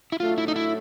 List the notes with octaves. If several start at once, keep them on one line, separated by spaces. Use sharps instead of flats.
E4
A2 F#3 A3 D4 F4
E4
D#4
E4